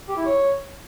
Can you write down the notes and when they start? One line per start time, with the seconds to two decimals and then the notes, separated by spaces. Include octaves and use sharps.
0.08 G4
0.17 E4
0.26 C#5